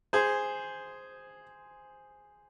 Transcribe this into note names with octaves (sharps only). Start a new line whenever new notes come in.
G#4 C5